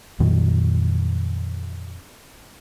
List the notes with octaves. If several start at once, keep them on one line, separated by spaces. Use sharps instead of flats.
F2 A#2 D#3 F#3